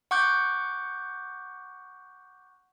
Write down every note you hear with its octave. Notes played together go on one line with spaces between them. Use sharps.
F#5 C#6 D6 F#6 G6